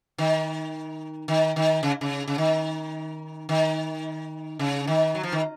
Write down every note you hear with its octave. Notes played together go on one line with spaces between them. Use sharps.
D#3
D#3
D#3
C#3
C#3
C#3
D#3
D#3
C#3
D#3
F#3
F3
D#3